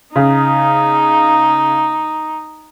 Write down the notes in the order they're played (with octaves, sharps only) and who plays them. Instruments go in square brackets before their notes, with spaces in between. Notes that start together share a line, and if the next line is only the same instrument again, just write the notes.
[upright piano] C#3 [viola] D#4